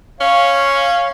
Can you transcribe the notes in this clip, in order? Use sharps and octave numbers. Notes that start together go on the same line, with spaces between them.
C#4 C#5 F5